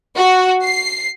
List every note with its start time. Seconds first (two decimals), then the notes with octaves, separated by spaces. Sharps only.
0.15 F#4
0.64 C7